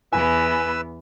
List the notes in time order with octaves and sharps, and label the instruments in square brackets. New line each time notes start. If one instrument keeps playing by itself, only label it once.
[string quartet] E2 E3 B3 [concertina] B4 E6 [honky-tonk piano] G#5